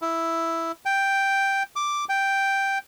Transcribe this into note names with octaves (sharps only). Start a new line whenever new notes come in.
E4
G5
D6
G5